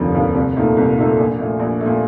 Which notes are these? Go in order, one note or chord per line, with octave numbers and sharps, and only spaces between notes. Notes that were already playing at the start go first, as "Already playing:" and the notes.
Already playing: F1 D#2 D3 F3
D#2 D3 F3
C2
A#2 A3 D#4 A4
C2
A#2 A3 D#4 A4
A#1
A#2 A3
A#1
A3
A#2